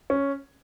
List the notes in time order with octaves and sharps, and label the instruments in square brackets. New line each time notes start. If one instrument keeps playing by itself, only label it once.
[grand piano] C#4